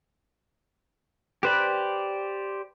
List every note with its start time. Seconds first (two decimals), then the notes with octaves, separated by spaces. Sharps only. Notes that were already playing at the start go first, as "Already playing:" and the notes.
1.43 G4 B4 C5 D5